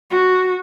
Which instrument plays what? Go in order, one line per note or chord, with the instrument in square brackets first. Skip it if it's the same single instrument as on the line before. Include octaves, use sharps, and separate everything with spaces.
[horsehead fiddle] F#4